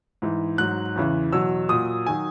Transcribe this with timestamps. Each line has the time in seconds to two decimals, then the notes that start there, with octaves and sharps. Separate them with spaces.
0.22 G#2 E3
0.58 G#2 F#3 F#6
0.96 E2 C#3 E3
1.33 E2 B2 F#3 E6
1.69 A#2 F#3 D#6
2.06 D#3 F#3 G#5